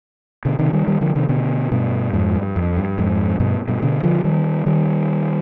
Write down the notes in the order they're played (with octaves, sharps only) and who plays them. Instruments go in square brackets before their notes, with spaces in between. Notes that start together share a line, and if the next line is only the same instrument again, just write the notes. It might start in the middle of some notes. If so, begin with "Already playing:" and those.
[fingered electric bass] B2 D3
C3 D#3
D#3 G3
D#3 G3
D3 F3
C3 D#3
B2 D3
G2 B2
F2 G#2
G2
F2
G2
F2 G#2
G2 B2
G2 B2
B2 D3
D3 F3
D#3 G3
D#3 G3